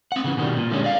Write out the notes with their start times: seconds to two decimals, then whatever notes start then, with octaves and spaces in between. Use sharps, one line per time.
0.12 C4 F#5
0.24 C#3 E3
0.37 B2 D#3 G3
0.57 A#2
0.70 D3 G3 G#3 C#4
0.84 D5 F5